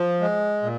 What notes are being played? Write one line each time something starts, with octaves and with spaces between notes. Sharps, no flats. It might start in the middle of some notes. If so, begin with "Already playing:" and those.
Already playing: F3
G#3
A#2